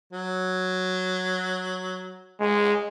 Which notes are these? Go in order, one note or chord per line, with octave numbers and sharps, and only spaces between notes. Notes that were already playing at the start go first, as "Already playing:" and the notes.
F#3
G#3